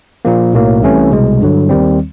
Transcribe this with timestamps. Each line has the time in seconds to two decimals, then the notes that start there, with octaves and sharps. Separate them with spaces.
0.25 A#2 F3 A#3
0.53 B1 A2 F#3 A#3
0.83 C2 C3 E3 A3 C#4
1.11 C2 B2 G#3
1.40 G2 D3 F#3
1.69 D#2 D#3 G3 C4